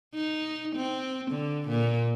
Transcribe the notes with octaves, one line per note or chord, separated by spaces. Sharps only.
D#4
C4
D3
A#2